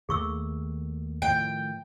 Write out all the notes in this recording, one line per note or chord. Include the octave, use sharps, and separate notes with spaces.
D#2 D#3 A3 G#4 C#6 E6
A2 D#3 F3 G5